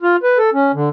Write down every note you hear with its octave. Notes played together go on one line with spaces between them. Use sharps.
F4
B4
A4
C#4
D3